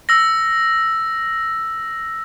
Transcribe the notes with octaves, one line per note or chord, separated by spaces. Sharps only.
E6 A#6